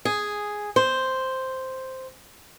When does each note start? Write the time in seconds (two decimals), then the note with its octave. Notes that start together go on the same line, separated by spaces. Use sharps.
0.05 G#4
0.76 C5